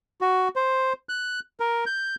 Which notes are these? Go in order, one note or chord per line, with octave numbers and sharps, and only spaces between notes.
F#4
C5
F#6
A#4
G6